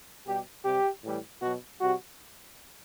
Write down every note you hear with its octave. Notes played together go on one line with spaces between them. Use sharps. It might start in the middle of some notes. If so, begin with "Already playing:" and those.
B2 G3 G4
C3 G3 G4
A2 E3 G3
B2 F#3 F#4
C3 G3 F#4